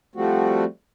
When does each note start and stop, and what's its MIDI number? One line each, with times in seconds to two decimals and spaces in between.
0.16 0.64 53
0.16 0.64 55
0.16 0.64 57
0.16 0.64 60
0.16 0.64 66